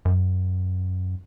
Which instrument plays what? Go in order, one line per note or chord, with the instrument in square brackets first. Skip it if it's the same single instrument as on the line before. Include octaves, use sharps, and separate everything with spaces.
[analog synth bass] F#2